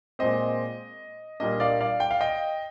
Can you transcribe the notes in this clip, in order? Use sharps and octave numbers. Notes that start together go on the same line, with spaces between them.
A#2 G#3 C4 D#5
A#2 G3 A#3 D4 D#5
D5 F5
D5 F5
G5
F5
D#5 G5